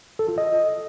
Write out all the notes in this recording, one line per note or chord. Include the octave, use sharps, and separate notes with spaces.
A4
F4
D#5